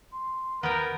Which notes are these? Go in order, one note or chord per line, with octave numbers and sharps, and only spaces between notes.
C6
D#2 B3 A#4 D#5 G5